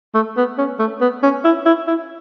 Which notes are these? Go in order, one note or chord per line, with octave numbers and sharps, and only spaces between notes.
A3
B3
C#4
A3
B3
C#4
E4
E4
E4